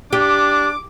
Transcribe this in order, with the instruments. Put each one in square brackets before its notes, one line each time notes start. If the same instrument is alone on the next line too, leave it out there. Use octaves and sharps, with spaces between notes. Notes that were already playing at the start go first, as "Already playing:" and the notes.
[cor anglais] D4 [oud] G4 [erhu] D6